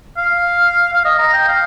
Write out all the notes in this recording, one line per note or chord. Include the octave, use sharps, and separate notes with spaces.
F5
F5
D#5
A#5
G5
F5